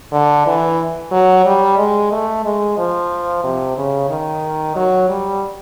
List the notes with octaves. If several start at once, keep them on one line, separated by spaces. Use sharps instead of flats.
D3
E3
F#3
G3
G#3
A3
G#3
F3
C3
C#3
D#3
F#3
G3